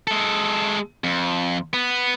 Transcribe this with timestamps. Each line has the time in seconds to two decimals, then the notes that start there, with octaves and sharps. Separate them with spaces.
0.07 G#3 A4
1.04 F2
1.73 B3